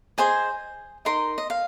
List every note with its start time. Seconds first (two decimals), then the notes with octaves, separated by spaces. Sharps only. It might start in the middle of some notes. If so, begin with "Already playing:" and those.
0.18 G#4 C5 D#5 G#5
1.05 D#4 A#4 D#5 C6
1.38 D#5
1.50 F5